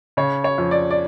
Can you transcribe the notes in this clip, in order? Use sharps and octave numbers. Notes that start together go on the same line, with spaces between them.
C#3 C#5
C#5
F2
D5
D5